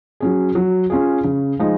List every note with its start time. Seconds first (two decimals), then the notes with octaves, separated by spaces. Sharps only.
0.20 F#3 C#4 G#4
0.55 F#3
0.90 C#4 F4 G#4
1.24 C#3
1.59 F3 G#3 D#4